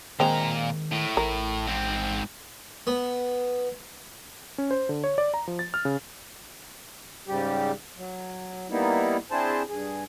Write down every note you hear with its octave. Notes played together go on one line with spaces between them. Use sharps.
A#2 D#3 G#3 A#3 C4 A#5
A2
A1 A#4
G#2 C4
B3
C#4
C5
D3
C#5
D5
A#5
F3
A6
F6
C#3
G#2 C#3 G3 G4
F#3
G3 A#3 B3 D#4 E4
C4 D4 E4 G#4 C5 A5
G2 G#4